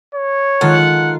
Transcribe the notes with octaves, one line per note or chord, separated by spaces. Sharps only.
C#5
D#3 G#3 F4 A4 F#5